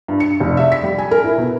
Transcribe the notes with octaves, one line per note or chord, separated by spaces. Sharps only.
G2
C#7
F1
E5
B6
G3
G#5
A#4
E4
B2